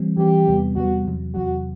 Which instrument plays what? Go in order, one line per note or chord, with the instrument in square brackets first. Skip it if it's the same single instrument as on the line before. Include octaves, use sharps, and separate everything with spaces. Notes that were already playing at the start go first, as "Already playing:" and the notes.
Already playing: [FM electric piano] E3 G3 C4
[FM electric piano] E3 G3 C4 [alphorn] G4
[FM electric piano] E2 C3 G3 B3
[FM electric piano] E2 C3 G3 B3 [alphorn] F#4
[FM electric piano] E2 C3 F#3
[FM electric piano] E2 C3 F#3 [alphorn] F#4